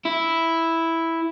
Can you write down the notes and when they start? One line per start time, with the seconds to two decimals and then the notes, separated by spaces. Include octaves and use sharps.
0.05 E4